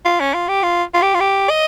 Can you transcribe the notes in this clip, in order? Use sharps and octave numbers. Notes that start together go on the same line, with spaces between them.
F4
C#4
F4
G4
F4
F4
G4
F4
G4
D#5